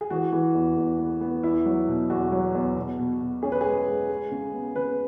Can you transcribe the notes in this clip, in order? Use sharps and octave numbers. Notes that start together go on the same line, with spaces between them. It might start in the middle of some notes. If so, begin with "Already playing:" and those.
G#4
E3 F#4
E3
E2
E2
B3
B3
E2 E4
F#3
B2
E2 F#4
F#3
E2
B2
B2
B2
C#4 G#4
B4
G#3 G#4
G#3
G#3
C#3
B3
C#3 B4